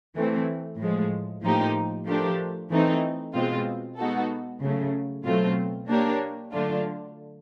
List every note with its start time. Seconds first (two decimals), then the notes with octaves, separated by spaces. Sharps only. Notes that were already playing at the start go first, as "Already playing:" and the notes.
0.15 E3 A3 C4
0.78 A2 F3 G#3
1.42 A2 F3 A#3 D#4 G4
2.05 F3 A3 D4 G4 A#4
2.70 E3 A3 C4 D#4
3.33 B2 G#3 C4 F4
3.97 G#3 B3 D#4 F#4 A4
4.62 C#3 F#3 A3
5.24 B2 F#3 A3 C4 F4
5.88 A#3 D4 G4 A#4 C#5
6.53 D3 F#3 A3 D4 F4